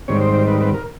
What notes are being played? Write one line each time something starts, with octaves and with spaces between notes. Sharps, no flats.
G#2 D#3 G3 C4 C#5
C5
C5
B4
B4
A#4